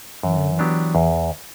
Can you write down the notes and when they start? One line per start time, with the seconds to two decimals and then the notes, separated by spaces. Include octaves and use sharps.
0.23 F#2 E3
0.37 D3
0.51 E3
0.59 F#3 B3 D4 G4
0.95 E2